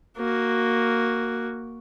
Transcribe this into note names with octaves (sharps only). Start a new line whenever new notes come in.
A#3 F#4